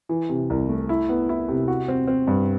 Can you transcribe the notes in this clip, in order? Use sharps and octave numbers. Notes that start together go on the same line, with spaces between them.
E3
C3
C2
A3
E4
B3
E4
C3
F#4
C4
C4
G2